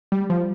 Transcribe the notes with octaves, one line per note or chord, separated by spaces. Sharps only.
G3
F3